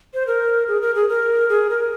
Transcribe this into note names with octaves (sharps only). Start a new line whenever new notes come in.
C5
A#4
G#4
A#4
G#4
A#4
G#4
A#4